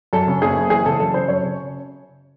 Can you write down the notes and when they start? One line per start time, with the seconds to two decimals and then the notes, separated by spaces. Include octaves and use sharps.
0.13 F#2 A4
0.28 C#3
0.42 F#1 G#4
0.56 F#1
0.70 E3 G#4
0.85 C#3 A4
0.99 F#2 A4
1.14 C#3 C5
1.28 F#2 C#5
1.43 C#3